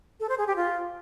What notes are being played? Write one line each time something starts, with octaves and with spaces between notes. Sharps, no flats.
A4
C5
G#4
G4
F4